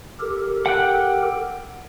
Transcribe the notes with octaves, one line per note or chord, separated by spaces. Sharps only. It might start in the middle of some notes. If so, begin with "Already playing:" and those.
G4 A4 A#4
F#5 G5 F#6